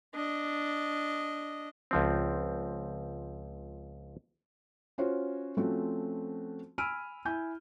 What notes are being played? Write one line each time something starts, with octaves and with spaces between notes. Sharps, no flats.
D4 D#5
C#2 F3 C4
C#4 F4 F#4 C5 C#5
F3 A3 C4 C#4 F#4
G#5 B5 E6 F6 D7 D#7
E4 G#5 G6